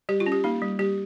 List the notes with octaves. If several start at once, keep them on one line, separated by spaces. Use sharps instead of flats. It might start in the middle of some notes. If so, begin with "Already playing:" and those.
G3 G4
F4
C#4
G4
A#3 D#4
G3
G3 G4